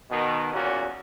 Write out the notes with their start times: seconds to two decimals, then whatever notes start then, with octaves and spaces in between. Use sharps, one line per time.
0.11 B2 D#3
0.53 E2 A#2 F#3 C#4 F#4